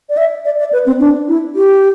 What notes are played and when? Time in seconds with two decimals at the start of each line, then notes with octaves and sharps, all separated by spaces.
0.09 D5
0.17 E5
0.45 D5
0.59 D5
0.73 B4
0.86 C4
1.00 D4
1.28 E4
1.55 G4